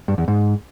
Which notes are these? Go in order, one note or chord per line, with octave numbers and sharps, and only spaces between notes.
G2
E2
G#2